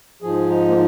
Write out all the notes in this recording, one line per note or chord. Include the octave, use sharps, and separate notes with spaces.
G#2 F3 G#4
D#4
A#3